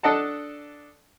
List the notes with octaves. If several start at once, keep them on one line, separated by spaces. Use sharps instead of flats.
D4 A4 D#5 F#5 A5